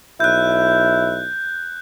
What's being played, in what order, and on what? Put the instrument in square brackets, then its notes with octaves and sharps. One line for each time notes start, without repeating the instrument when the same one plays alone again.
[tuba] B1 [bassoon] E4 [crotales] F#6 G6